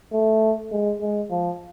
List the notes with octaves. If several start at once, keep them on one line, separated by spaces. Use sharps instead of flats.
A3
G#3
G#3
F3